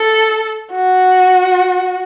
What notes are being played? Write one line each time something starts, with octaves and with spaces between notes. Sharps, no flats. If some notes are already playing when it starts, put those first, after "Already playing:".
Already playing: A4
F#4